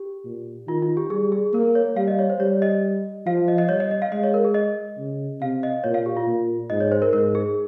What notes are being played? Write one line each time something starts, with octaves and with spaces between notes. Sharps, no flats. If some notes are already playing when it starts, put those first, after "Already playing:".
Already playing: G4
A#2
D#3 F4
F4
G4
G3 G#4
G#4
A#3 A#4
C#5
G3 F5
D#5
C#5
C5
G3 C#5
D#5
F3 F5
D#5
D#5
G3 C#5
D#5
D#5
F5
G#3 D#5
C#5
A#4
G#4
D#5
C#3
C3 F5
D#5
A#2 C#5
F5
G4
F4
A#2
G#2 D#5
C#5
C5
A#4
G#2 A#4
G#4